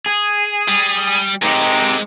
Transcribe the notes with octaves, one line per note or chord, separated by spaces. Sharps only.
G#4
G3
G#3 C4 D#4 G4 A#4